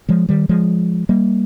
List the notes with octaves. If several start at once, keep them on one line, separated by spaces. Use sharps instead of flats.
F3 G#3
D#3 G3
F3 G#3
G3 A#3